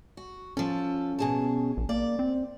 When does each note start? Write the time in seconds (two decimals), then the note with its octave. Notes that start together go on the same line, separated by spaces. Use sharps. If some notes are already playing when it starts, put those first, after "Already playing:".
0.17 F#4
0.57 F3 C#4 A4
1.19 B2 G#4 A5
1.77 A#1
1.89 A#3 D5
2.19 C4